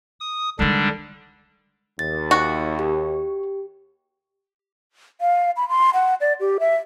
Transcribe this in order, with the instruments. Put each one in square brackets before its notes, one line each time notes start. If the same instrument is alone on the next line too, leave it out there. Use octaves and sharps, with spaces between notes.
[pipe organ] D#6
[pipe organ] D3 G3 D4 [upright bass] D#3 G#3
[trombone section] D#2 [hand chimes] A6
[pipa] F#4
[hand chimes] G4
[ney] F5
B5
C6
F#5
D5
G4
E5